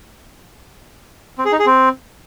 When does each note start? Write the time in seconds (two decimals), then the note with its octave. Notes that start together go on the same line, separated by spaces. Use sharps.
1.38 C4
1.45 G#4
1.52 D#4
1.59 G#4
1.66 C4